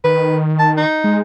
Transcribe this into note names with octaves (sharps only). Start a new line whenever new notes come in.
D#3 B4
A5
D#4
G#3